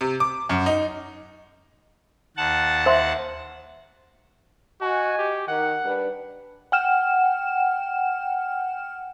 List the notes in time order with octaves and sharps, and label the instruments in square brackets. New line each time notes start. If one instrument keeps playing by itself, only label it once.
[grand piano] C3
D6
F#2
D#4
[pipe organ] D#2 F#5 A5
[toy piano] C5 E5 C6
[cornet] F#4 [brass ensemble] D#5 G#5
[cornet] G4
[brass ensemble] D#3 [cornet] F#5
[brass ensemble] G3 D4 B4
[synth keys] F#5 G5 F6 E7